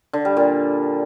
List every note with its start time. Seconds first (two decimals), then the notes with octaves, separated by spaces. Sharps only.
0.13 D3
0.25 G3
0.37 A#2